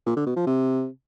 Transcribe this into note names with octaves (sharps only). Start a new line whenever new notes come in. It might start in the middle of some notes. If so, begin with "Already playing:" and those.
A#2
D3
B2
F3
C3